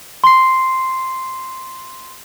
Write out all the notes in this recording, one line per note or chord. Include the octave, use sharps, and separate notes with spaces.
C6 C7